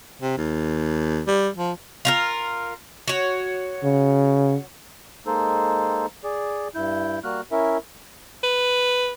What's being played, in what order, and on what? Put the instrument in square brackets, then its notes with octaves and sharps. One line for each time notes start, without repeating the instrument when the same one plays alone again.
[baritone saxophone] C3
D#2
G3
F3
[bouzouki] F4 F#4 A#4
F#4 C#5
[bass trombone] C#3
[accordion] G#3 A#3 D#4 A4 C5
G#4 D5
G2 E4 G6
G3 A#3 F#4 F6 F#6
C#4 E4 A#4 E5
[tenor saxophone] B4